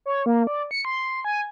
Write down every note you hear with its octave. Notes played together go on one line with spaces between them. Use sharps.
C#5
A#3
D5
C#7
C6
G#5